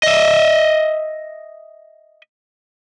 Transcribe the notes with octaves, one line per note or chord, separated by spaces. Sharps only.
D#5 E5